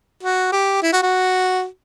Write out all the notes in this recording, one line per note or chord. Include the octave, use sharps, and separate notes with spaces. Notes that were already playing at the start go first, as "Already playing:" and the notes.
F#4
G4
E4
F#4
F#4